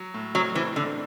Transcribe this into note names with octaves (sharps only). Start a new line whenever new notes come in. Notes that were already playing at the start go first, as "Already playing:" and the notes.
Already playing: F#3
A2
F#3 C4
E3 C4
A2 D3